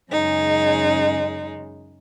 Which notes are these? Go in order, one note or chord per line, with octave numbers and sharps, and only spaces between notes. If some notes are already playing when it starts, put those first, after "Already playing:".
F#2 C#3 G#3 D#4